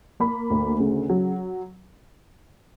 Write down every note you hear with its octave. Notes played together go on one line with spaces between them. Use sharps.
A#3 B5
D2
C#3
F#3